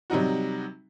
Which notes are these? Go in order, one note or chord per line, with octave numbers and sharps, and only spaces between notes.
C3 F#3 G3 D#4 F#4